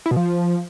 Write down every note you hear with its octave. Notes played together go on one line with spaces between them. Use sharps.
E4
B2
F3